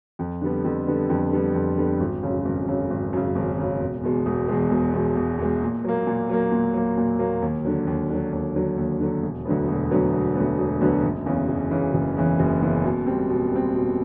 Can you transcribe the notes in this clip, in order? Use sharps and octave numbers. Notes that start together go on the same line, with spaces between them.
F2
D3 G3 B3
F2
D3 G3 B3
F2
D3 G3 B3
F2
D3 G3 B3
G#1
F#2 C#3
G#1
F#2 C#3
G#1
F#2 C#3
G#1
F#2 C#3
E1
E2 B2 G#3
E1
E2 B2 G#3
E1
E2 B2 G#3
E1
E2 B2 G#3
A#2
F#3 A#3
A#2
F#3 A#3
A#2
F#3 A#3
A#2
F#3 A#3
D#2
D3 F#3
D#2
D3 F#3
D#2
D3 F#3
D#2
D3 F#3
E1
D2 D3 F#3 B3
E1
D2 D3 F#3 B3
E1
D2 D3 F#3 B3
E1
D2 D3 F#3 B3
F#1
E2 C#3 E3
F#1
E2 C#3 E3
F#1
E2 C#3 E3
F#1
E2 C#3 E3
B2
G3 C4
B2
G3 C4
B2